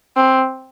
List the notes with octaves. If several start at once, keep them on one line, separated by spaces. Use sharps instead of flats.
C4